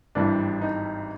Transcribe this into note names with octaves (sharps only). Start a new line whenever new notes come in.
G#1 G2 E3 G3 D4
D#4